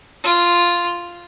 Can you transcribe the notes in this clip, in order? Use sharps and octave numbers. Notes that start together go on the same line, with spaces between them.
F4